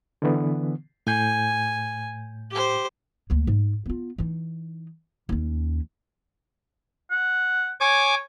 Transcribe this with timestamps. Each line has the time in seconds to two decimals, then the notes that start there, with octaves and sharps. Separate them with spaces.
0.22 D3 E3 B3
1.07 A2 G#5 G6
2.50 G4 C5
3.30 D2 A#3
3.47 G#2
3.86 B3 F4
4.18 E3 D#4
5.29 D#2 C#4
7.11 F#5
7.80 C#5 G#5 D6